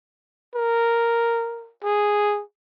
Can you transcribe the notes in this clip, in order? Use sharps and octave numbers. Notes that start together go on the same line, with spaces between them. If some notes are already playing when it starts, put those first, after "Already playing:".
A#4
G#4